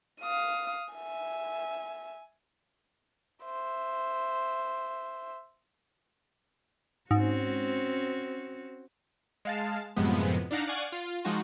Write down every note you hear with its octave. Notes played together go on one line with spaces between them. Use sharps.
F5 D#6
E5 G#5
C5 E5
G#2 C4 C#4 F#4
G#3 F5 A5
F#2 A2 C3 F3 G#3 B3
D4 D#4 F5 F#5 A#5
D5 F5 F#5 G#5 C#6
F4
F3 G#3 D#4 F4 F#4